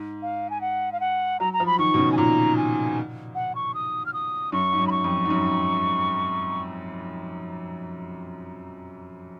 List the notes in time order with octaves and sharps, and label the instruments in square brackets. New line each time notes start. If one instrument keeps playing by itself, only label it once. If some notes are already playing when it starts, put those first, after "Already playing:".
Already playing: [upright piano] G#2
[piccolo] F5
G#5
F#5
F5
F#5
[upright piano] F#3 [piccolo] A#5
[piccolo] A#5
[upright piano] F3
[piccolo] B5
[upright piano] D#3 [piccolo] C#6
[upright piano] B2
C#3
[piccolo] G#5
[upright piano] A#2 [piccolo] A#5
[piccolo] G#5
F#5
C#6
D#6
F6
D#6
[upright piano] F#2 [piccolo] C#6
[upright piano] G#2
F#2
[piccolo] B5
C#6
[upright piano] F2
G#2
F#2